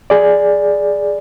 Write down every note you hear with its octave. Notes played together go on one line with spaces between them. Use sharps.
G#4 D5